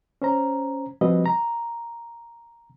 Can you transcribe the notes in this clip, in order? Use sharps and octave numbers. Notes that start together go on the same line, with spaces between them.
C#4 C5 A#5
F3 G3 C4 F#4 B4 D#5
A#5